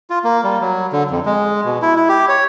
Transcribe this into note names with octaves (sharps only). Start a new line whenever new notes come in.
F4
A#3
G3
F#3
D3
F2
G#3
B2
E4
E4
G4
C#5